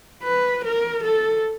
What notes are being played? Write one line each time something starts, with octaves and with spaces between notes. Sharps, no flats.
B4
A#4
A4